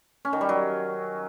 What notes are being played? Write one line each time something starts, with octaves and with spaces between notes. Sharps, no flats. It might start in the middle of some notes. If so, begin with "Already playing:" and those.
C#4
D#3
G3
F#3